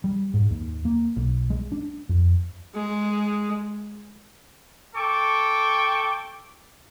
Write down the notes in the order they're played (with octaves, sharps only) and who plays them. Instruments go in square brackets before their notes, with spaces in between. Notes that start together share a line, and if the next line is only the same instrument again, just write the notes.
[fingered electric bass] G3
G#2
D#2
A#3
B1
G#3
D4
F2
[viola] G#3
[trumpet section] A4 G5 C#6 D6